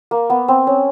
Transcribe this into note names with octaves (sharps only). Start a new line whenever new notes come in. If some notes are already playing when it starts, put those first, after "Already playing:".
A#3
B3
C4
C#4